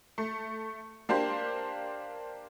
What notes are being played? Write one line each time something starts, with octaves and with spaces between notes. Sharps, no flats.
A3
A#3 D4 G4 C5